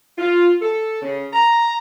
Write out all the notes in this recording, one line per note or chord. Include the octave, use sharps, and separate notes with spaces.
F4
A4
C#3
A#5